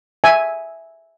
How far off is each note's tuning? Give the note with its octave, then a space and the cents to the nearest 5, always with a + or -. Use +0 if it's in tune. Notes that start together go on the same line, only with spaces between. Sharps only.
E5 +0 G#5 +0